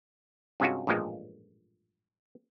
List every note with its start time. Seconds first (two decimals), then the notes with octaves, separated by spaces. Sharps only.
0.60 G2 C3 G#3 C#4 F4 F#4
0.87 A1 G2 A#2 F3 G#3